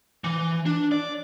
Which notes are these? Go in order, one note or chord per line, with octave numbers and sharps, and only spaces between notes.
E3
D4
D5